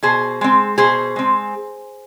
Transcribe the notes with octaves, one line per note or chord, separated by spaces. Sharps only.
B2 G#4 C5
G#3 C4
B2 G#4 C5
G#3 C4